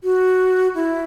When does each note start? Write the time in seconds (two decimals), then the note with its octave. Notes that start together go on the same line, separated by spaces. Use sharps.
0.04 F#4
0.75 E4